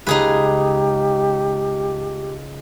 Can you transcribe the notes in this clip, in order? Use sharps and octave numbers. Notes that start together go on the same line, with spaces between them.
C#2 D#4 G4 G#4 B4